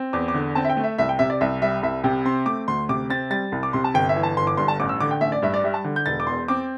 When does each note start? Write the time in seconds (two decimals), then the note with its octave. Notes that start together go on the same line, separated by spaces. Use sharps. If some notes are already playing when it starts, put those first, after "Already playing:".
Already playing: C4
0.13 E2 D6
0.28 D6
0.34 D3
0.55 C4 A5
0.65 E5
0.69 G5
0.77 A3
0.84 E5
0.98 C2 E5
1.09 G5
1.19 C3 E5
1.30 D5
1.41 C2 E5
1.62 G3 E5
1.83 C2 E5
2.04 C3 G5
2.25 C4 C6
2.46 A3 D6
2.68 D2 C6
2.89 C3 D6
3.10 C4 A6
3.30 G3 A6
3.52 C2
3.63 D6
3.73 C3 C6
3.84 A5
3.94 G1 G5
4.09 E5
4.16 E3
4.23 A5
4.37 G1 C6
4.47 D6
4.57 G2 C6
4.68 A5
4.79 A1 D6
4.89 E6
5.00 D3 D6
5.11 G5
5.21 A1 E5
5.32 D5
5.42 G2 E5
5.54 D5
5.64 G3 E5
5.74 A5
5.84 D3
5.96 G6
6.06 E1 A6
6.20 D6
6.27 E2 C6
6.48 C4 D6